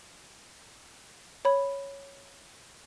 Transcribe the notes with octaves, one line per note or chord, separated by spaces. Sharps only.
C#5 B5